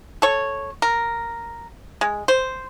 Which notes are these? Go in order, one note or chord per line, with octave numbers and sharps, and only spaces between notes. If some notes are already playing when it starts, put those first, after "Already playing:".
A4 C#5
A#4
G#3
C5